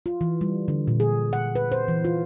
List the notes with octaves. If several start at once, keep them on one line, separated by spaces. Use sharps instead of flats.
F4
E3
G3
D3
A#2
G#4
F#5
B4
C5
E3
F4